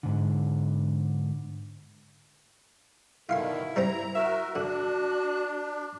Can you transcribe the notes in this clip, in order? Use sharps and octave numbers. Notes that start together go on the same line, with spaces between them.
G#2 D3
B2 D3 D#3 E4 F4 F5 C6
G3 C4 C5 A#5
F#4 A#4 E5
D3 D4 F#4